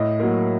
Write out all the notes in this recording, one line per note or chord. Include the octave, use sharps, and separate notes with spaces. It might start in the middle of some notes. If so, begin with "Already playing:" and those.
Already playing: A2 D#5
F#3 A#3